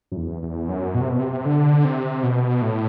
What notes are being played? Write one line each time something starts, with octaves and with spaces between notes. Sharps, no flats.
F#2
E2
E2
F#2
B2
C3
B2
C3
D3
C3
B2
A2